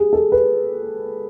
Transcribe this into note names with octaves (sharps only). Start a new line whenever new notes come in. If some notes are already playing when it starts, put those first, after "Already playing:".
Already playing: G4 G#4
A4
B4